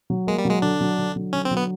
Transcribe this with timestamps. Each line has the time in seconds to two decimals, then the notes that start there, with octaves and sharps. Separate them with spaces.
0.10 F#3
0.27 G#3 A#3
0.38 G3
0.45 F#3
0.50 G#3
0.62 D3 D4
0.81 F#3
0.98 D3
1.16 F#3
1.33 D3 C#4
1.45 C4
1.51 F#3
1.57 B3